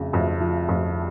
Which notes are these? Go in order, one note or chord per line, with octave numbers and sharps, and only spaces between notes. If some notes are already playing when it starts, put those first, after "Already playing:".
Already playing: F2 C#3
F2
F3
F2